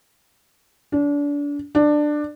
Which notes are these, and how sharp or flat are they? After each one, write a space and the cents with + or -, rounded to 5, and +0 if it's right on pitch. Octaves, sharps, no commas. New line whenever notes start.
D4 -30
D4 +15